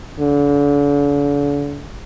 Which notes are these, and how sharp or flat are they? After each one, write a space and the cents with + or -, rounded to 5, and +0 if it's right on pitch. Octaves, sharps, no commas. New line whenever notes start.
D3 -40